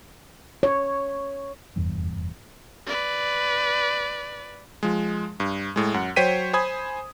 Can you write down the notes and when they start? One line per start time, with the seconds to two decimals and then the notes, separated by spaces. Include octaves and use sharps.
0.63 C#5
1.76 F1 E2 G2
2.86 B4 D5
4.83 F3 G#3
5.40 G2
5.76 A2 G#3
5.94 F#2 F#5
6.16 F#3 C5 C#5 G5 B6 D#7
6.53 C5 G#5 B5 D#6 G#6